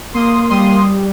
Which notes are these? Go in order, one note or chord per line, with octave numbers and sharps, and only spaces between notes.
A#3 C6 D#6
G3 C6 D#6